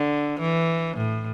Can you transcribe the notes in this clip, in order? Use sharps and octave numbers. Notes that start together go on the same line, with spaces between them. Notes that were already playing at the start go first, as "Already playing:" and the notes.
Already playing: D3
E3
A2